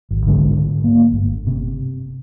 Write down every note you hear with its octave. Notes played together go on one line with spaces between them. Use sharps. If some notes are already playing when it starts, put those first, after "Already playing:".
G#1
C2 G#2 D3 G#3
A#3
G1
C3